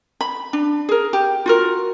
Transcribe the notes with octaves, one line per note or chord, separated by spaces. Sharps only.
B5
D4
G#4 A#4
G4
F4 F#4 A#4